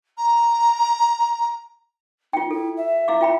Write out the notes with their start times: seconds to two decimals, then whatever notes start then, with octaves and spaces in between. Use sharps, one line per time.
0.17 A#5
2.33 D#4 F4 G5
2.51 E4 A4
2.77 E5
3.08 E4 F5 D6
3.21 F4 G5 B5